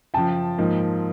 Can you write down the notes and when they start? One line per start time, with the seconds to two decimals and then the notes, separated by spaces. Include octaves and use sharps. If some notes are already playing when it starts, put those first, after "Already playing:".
0.14 F#2 C#3 F3 G5 A5
0.58 G#2 F3 A#3